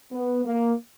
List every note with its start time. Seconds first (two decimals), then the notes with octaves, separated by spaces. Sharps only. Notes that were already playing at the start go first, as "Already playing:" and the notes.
0.12 B3
0.45 A#3